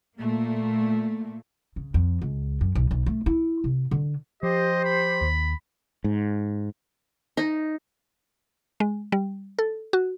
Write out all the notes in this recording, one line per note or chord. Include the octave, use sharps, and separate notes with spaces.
A#2 A3 A#3
C#3
F2
C#2
F#2
B1
B1
A3
E4
C3
D3
F3 G4 C5 D#5
B5
D#2
G#2
D#4
G#3
G3
A4
F#4